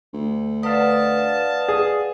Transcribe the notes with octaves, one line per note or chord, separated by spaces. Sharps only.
D2
B4 D5 D#5 F5 F#5 A5
G#4